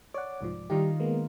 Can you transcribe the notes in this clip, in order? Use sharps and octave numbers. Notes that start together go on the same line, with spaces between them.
C#5 D5 F#5
C2 G#2 F3
D#3 G3 D#4 F4 G4
G#3 A#3 B3